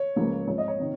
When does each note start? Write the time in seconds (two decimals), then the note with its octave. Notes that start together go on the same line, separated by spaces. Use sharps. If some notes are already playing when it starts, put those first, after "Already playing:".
Already playing: C#5
0.16 C#2 C#3 F3 A#3
0.47 G#2 F3 C4 C#5
0.58 D#5
0.68 C#5
0.79 C3 D#3